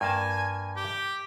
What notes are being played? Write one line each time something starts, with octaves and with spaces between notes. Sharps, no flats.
G2 A#3 G#5 A5
G4